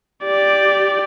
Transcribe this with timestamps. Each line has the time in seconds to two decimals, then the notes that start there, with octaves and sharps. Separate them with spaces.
0.24 G4 D5